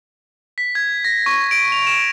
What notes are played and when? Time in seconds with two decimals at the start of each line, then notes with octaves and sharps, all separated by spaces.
0.58 B6
0.75 G#6
1.05 A#6
1.26 C#6
1.51 D7
1.72 F7
1.87 E7